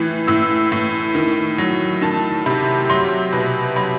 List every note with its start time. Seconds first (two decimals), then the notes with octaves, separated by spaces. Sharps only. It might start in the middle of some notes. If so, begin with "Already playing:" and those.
Already playing: A2 E3
0.27 A2 E6
0.72 A2
1.15 D#3
1.58 F#3
2.02 D#3 A5
2.46 C3 B5
2.89 F#3 C6
3.33 B2 B5
3.76 F#3 B5